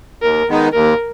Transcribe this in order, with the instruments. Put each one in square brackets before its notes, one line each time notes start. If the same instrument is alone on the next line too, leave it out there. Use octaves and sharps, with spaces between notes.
[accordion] D#2 [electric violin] A#4
[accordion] D#3 G#3 B3 D#4
[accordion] D#2 [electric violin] A#4